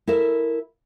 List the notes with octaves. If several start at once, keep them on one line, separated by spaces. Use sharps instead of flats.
E4 A4 A#4 E5